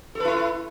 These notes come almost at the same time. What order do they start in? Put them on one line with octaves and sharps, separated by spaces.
A4 B4 E4